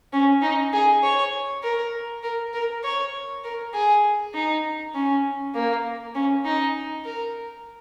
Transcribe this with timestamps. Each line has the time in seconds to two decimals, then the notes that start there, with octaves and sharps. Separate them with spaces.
0.13 C#4
0.43 D#4
0.73 G#4
1.03 C#5
1.63 A#4
2.23 A#4
2.54 A#4
2.84 C#5
3.44 A#4
3.74 G#4
4.35 D#4
4.95 C#4
5.55 A#3
6.15 C#4
6.45 D#4
7.05 A#4